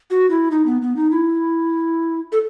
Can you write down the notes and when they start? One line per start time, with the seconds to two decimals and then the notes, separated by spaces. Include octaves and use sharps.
0.11 F#4
0.30 E4
0.51 D#4
0.66 B3
0.82 B3
0.96 D#4
1.11 E4
2.32 A4